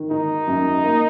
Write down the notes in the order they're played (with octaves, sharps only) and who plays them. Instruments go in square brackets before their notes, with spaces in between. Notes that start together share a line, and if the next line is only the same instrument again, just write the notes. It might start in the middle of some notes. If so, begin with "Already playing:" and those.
Already playing: [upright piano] D#3
[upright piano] D#3 [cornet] D#4
[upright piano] F#2
A#3